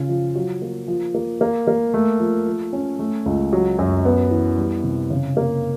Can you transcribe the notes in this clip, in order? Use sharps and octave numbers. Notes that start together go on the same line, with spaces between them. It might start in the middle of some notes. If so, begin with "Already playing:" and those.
Already playing: C#3 F4
F3
F#3
A#3
F3
A#3
A#3
A#3
A3
F3
F3
C#4
A3
C#2
F#3
F#2
B3
E3
G3
C3
C#3
A#3